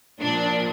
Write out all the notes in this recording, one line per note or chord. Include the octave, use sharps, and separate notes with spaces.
A#2 F3 D4